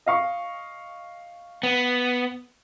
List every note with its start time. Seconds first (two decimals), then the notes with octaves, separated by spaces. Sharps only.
0.06 D#5 F5 C#6
1.63 B3